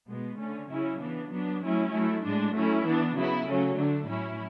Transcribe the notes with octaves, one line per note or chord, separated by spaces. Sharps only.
B2 G#3 B3
D3 A3 C#4
C#3 F#3 C#4 E4
E3 B3 D4
F#3 B3 D4
F#3 A3 C#4 E4
F#3 A3 E4
A2 G#3 D4
F#3 A3 C#4 E4
E3 B3 D4
C#3 F#3 B3 E4
C#3 F#3 A3 C#4
D3 A3 D4
A2 F#3 C#4 E4